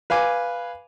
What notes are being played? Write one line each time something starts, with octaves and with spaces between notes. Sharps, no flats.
B4 F5 G#5 D6